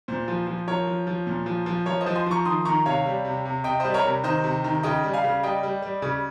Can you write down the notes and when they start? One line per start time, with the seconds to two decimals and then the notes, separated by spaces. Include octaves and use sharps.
0.08 A#2 C5
0.28 F3
0.47 F3
0.67 F3 A#4 C#5
0.87 F3
1.07 F3
1.27 A#2
1.46 F3
1.66 F3
1.86 F3 A#4 C#5
2.01 C5 D#5
2.06 F3
2.15 G#5 C6
2.26 F3 A#5 C#6
2.45 D#3 C6 D#6
2.65 D#3 A#5 C#6
2.86 C3 C#5 F5
3.06 G3
3.25 C3
3.45 C3
3.64 C3 D#5 G5
3.80 G3 C5 D#5
3.94 A#4 C#5
4.04 C3
4.24 D#3 C5 D#5
4.44 C3
4.64 D#3
4.83 C#3 D#5 G5
5.03 G3
5.13 F5 G#5
5.24 C#3
5.43 G3 D#5 G5
5.63 G3
5.82 G3
6.02 C#3